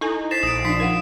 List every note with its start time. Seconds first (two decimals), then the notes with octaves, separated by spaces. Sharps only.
0.01 D#4 E4 A4 G#5
0.31 C5 A6 B6 C7 E7
0.43 A#1 D#6 D7
0.65 F3 D4 D#4 D5 B6
0.80 A#4 F5 F#5